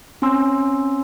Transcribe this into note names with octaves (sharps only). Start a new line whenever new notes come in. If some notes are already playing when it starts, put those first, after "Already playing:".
C4 C#4 G#5 C6 E6